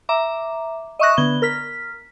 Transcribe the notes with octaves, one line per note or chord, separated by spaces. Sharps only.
E5 A#5 D6
D#5 E5 C#6 D#6 F#6 A#6
D3 B3 G#6 G7
A#4 F6 B6